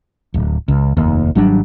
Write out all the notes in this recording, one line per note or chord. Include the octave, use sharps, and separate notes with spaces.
D1
C#2
F1 D#2
G#1 F#3 G3 D4